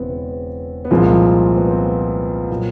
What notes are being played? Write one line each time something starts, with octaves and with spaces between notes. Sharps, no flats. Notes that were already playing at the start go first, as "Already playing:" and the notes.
Already playing: E1 E2 C#3 E3 B3 C4
B3
C2 A#2 F3 G#3 C4
B3
C4
A#2 F#3